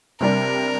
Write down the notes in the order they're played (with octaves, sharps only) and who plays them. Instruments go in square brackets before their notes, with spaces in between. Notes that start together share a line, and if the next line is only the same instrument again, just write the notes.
[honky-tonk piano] C3 G3 D4 [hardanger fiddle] A#4